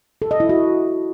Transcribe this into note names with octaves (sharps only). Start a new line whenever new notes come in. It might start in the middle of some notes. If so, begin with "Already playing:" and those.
A4
D#5
E4
F#4